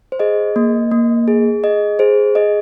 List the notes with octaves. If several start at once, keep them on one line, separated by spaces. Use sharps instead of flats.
C5
G#4 D#5
A#3
A#3
G#4
G#4 D#5
G#4 C5
G#4 D#5